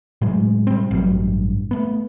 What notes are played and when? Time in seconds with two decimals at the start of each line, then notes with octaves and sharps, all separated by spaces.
0.22 A2 F#3 G#3
0.67 G3 C4
0.91 A1 G2 F#3
1.71 A3 B3